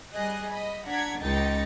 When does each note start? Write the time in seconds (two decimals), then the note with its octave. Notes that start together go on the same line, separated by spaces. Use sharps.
0.12 G3 G#4 D#5 F#6
0.51 D#5 B5
0.86 D4 F#5 A#5 G#6 B6
1.21 C#2 D#4 G5 A6 C#7